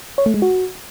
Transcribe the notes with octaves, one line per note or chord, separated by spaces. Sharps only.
C#5
A3
G#3
F#4